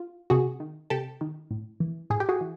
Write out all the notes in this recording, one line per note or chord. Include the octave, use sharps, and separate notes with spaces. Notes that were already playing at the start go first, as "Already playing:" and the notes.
Already playing: F4
C3 F#4 G#4
D#3
C3 G4 A4
D#3
A2
E3
A2 G#4
G4
F#4 G#4
E3